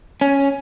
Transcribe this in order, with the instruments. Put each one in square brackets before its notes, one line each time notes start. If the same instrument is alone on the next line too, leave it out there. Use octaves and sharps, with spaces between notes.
[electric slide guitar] C#4